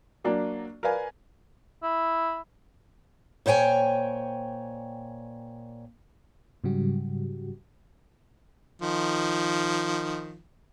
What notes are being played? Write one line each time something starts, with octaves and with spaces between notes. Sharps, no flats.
F#3 A#3 D4 D5
A#4 B4 D5 F5 G#5
E4
A#2 C5 C#5 G5 G#5
G#2 C#3 F#3 G3 F#4 G4
D#3 F3